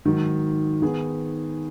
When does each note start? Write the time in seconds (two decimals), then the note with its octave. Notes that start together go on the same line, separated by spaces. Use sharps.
0.05 G#2 D#3 F#3
0.82 D#3 B3 G#4